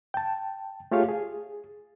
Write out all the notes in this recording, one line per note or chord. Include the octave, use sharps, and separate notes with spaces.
G5 A5
A3 F4 G4 G#4 C#5 F5
G#4